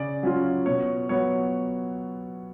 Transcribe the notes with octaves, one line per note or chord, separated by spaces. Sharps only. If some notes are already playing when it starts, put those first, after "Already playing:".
Already playing: C#3 D5
F#3 C#4 F4
B2 C#5
F#3 B3 C#5